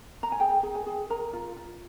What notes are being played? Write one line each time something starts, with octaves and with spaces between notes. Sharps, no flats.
A#5
G#5
G#4 G5
G#4
G#5
G#4
A#4 A#5
F4
F4